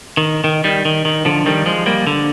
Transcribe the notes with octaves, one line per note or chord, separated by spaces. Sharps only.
D#3
D#3
D#3 G3
D#3
D#3
D3 F3
D#3 G3
F3 G#3
G3 A#3
D3